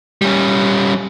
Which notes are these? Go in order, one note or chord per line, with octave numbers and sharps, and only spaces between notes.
G3 C#4